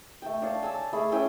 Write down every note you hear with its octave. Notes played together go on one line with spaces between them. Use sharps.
A3 G5
D4 C#5 F5 A5
G#5 A5 E6
A3 G#4 B5
C#4 E4 G5 G#5